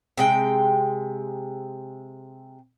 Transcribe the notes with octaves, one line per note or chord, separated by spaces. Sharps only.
C3 G#3 G5